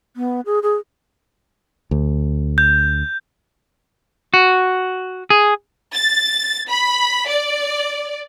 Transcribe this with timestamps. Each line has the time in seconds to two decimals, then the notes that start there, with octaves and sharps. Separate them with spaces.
0.17 B3
0.46 G#4
0.63 G#4
1.91 D2
2.58 G6
4.34 F#4
5.30 G#4
5.94 A6
6.69 B5
7.28 D5